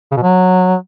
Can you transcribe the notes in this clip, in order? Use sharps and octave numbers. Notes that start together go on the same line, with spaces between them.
C#3
B2
F#3